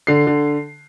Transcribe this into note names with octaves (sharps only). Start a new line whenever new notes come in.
D3 C7
D3